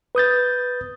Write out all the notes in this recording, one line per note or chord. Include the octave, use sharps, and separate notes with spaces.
B4 D#6 G6 A6